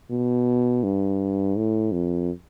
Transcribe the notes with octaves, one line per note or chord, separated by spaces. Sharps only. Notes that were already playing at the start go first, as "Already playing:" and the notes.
B2
G2
A2
F2